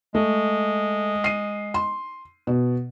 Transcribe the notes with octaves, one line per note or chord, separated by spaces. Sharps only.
G#3 A3
C7 D#7
C6
B2